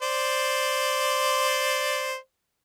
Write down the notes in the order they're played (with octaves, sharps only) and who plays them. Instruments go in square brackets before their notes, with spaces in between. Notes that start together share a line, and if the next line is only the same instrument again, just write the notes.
[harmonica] C5 D5